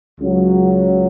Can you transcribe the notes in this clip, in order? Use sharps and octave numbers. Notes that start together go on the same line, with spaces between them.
C#2 C#3 F#3